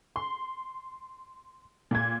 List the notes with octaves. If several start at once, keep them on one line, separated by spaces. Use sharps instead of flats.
C6
A#2 G#6